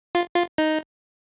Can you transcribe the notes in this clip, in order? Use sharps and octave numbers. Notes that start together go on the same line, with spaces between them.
F4
F4
D#4